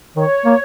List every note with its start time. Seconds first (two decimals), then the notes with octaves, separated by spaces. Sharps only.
0.16 D#3 C#5
0.45 A#3